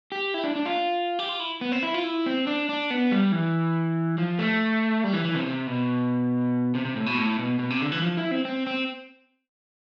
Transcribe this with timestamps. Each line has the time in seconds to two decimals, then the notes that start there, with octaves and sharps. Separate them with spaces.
0.12 G4
0.34 E4
0.44 D4
0.55 D4
0.66 F4
1.19 G4
1.29 F4
1.40 E4
1.61 B3
1.72 C4
1.83 E4
1.94 F4
2.04 E4
2.26 C4
2.47 D4
2.69 D4
2.90 B3
3.12 G3
3.32 E3
4.18 F3
4.39 A3
5.04 G3
5.13 E3
5.25 E3
5.35 C3
5.46 C3
5.67 B2
6.75 C3
6.85 C3
6.96 A2
7.06 B2
7.17 A2
7.39 B2
7.59 B2
7.70 C3
7.80 D3
7.92 E3
8.02 F3
8.17 E4
8.31 C4
8.45 C4
8.67 C4